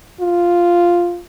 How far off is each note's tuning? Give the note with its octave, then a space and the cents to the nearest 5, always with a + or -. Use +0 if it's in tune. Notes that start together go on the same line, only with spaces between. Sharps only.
F4 +0